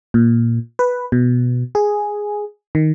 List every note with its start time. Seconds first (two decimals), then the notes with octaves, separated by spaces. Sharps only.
0.14 A#2
0.79 B4
1.12 B2
1.75 G#4
2.75 D#3